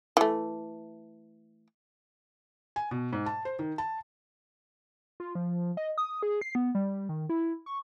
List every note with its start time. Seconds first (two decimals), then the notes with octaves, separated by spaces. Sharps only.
0.17 E3 A3
2.76 G#5
2.91 B2
3.13 G#2
3.26 A5
3.45 C5
3.59 D#3
3.78 A5
5.20 F4
5.35 F3
5.77 D#5
5.98 D#6
6.23 G#4
6.41 C7
6.55 B3
6.75 G3
7.09 D#3
7.29 E4
7.66 C#6